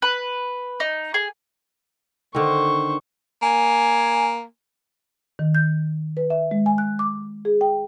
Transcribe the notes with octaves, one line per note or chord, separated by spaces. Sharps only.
B4
D#4
G#4
D3 D#3 C5 C#6
A#3 G#5
D#3
G6
B4
E5
G#3
G#5
F#6
D6
G#4
G5